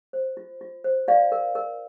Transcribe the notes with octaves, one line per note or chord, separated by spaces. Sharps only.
C5
F4
F4
C5
F4 D5 F5
A#4
A#4